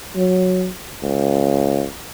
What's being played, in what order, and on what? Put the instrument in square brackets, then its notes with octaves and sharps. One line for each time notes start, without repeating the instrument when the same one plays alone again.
[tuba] F#3
C#2